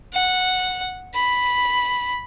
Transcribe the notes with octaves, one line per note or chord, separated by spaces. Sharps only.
F#5
B5